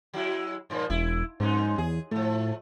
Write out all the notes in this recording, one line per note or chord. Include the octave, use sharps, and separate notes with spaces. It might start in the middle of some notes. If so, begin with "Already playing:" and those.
F#3 G#3 E4
G2 A#2 F3
E1 E4
F2 G#2 G#3 D#4
E2 G#4
A2 F3 A3